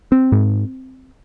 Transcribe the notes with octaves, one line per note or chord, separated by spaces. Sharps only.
C4
G#2